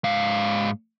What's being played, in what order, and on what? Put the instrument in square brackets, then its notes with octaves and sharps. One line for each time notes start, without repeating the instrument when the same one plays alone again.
[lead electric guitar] G#2 F5